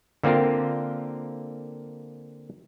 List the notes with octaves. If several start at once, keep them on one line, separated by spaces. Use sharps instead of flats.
D3 A#3 C4 F4 A#4